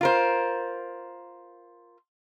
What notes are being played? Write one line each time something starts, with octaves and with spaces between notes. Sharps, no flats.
F4 A#4 C5